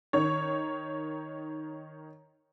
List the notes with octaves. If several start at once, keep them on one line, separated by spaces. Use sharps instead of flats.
D#3 C#5